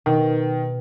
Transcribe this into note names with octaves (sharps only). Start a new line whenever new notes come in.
B2 D#3